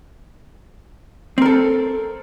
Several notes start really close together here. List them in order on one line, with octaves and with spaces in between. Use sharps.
C4 A#4 A4